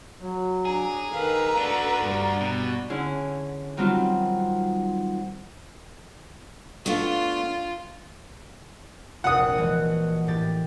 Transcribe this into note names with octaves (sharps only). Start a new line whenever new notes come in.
F#3
D4 G#4 A#5
D#3 A4 B4 F5
D4 F#4 D5
G2 G3
B2
D3 C#4 E4 G#4
D#3 F#3 G3 C4 D#4 F4
A3 B3 D4 F4
F1 A#1 F#5 D#6
E3 G#3 F#4
A2 G4 A6